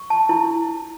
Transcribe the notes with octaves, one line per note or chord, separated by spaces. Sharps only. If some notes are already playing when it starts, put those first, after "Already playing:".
Already playing: C#6
A5
E4